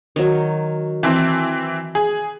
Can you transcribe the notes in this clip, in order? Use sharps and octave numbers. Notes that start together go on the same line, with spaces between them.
D#3 F#3
E3 C4 A5
G#4